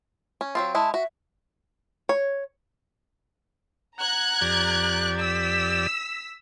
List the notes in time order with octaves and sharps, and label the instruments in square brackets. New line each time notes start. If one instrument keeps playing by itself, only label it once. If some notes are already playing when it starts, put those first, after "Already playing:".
[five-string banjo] C#4
F#3 C4 F4
[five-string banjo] G#3 E4 [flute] A5
[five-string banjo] F#4 [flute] E5
[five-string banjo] C#5
[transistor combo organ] F#5 [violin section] A#5 F#6 G#6
[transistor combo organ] F2 G4 D5
[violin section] E6 B6